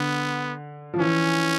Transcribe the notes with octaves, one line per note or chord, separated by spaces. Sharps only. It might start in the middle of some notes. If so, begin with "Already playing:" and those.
Already playing: D3 B3
F3
E3 C#4